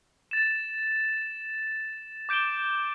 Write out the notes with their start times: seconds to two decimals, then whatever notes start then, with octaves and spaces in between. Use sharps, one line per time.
0.31 A6 E7
2.29 D6 G6 D7 E7 G7